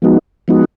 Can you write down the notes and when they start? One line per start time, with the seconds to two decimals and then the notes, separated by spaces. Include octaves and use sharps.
0.02 F3 G#3 B3 D#4 F#4
0.48 F3 G#3 B3 D#4 F#4